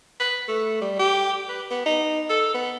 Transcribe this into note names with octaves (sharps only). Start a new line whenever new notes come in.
B4
A3
G3
G4
B4
B3
D#4
A4
B3